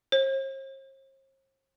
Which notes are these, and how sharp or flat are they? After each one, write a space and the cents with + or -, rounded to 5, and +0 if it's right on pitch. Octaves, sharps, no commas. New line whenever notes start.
C5 +45